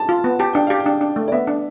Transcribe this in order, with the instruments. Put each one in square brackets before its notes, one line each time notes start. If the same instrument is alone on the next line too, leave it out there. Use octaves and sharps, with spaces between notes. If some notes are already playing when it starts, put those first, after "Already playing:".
Already playing: [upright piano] A5
[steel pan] F4
B3
[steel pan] G4 [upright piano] A5
[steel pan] D4 [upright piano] G5
[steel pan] G4 [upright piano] F5
[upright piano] G5
[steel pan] D4
D4
A3
[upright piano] D5
[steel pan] B3 [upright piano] E5
[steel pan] D4